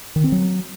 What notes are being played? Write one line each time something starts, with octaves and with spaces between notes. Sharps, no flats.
D#3
C4
F#3